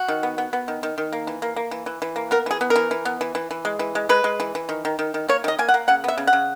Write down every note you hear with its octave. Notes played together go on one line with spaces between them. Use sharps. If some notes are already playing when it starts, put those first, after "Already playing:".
Already playing: F#4
D#3
B3
B3
B3
D#3
D#3
D#3
A#3
E3
A#3
A#3
E3
E3
E3
A#3
B3 A#4
E3 G#4
B3
A#4
E3
E3
B3
E3
E3
E3
G#3
E3
G#3
G#3 B4
G#3
E3
E3
D#3
D#3
D#3
D#3
A#3 C#5
D#3 D#5
A#3 G#5
F#5
A#3
C#3 F#5
B3 E5
C#3
F#5
C#3